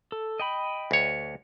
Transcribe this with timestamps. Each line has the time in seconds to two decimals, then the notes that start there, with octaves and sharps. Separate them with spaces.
0.12 A4
0.40 D#5 G5 B5
0.91 D2 C#5